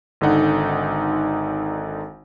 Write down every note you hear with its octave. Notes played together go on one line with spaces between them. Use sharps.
G#1 D3 D#4 F#5